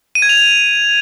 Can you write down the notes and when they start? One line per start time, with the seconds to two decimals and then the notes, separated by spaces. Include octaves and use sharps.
0.15 D#7
0.22 G#6
0.29 F7